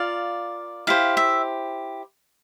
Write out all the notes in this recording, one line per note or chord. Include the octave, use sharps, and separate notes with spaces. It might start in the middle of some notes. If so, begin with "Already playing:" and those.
Already playing: F4 A#4 D5 F5
E4 G4 C5 F5
E5